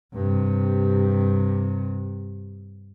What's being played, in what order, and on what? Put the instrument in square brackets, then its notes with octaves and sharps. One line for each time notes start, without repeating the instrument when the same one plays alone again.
[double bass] G2 C3